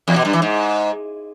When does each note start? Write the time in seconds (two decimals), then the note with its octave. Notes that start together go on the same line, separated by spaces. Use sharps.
0.08 E2
0.16 B2
0.25 G2
0.33 E3
0.42 G#2